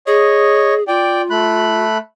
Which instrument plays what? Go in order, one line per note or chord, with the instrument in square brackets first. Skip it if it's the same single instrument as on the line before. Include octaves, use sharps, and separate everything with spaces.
[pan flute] G#4 [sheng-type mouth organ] C#5 D#5
[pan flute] F4 [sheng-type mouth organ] D5 G5
[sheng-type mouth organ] A3 B5 F#6